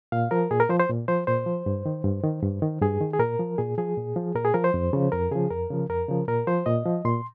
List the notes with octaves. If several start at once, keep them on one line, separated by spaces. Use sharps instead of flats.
A#2 F5
F3 A#4
A#2 G#4
A#4
F3 C5
C5
A#2
F3 C5
A#2 C5
F3
G2
D#3
G2
D#3
G2
D#3
G2 G#4
D#3
G#4
A#2 A#4
F3
A#2 G#4
F3 G#4
A#2
F3
A#2 A#4
G#4
F3 A#4
C5
F2
C#3 F3
F2 A#4
C#3 F3 G#4
F2 A#4
C#3 F3
F2 A#4
C#3 F3
A#2 A#4
F3 C5
A#2 D#5
F3
A#2 C6